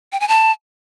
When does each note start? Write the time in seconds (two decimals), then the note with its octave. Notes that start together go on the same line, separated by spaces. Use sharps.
0.12 G5
0.20 G#5
0.28 A5